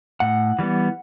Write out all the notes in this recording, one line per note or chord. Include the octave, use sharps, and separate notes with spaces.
A2 F#5
E3 G3 B3